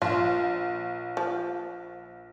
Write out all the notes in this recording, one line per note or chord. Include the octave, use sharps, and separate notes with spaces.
A#1 F4
F3